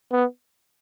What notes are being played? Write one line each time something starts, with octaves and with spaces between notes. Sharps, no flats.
B3